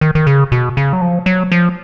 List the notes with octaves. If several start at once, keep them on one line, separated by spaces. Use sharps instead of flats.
D#3
D#3
C#3
B2
C#3
F#3
F3
F#3
F3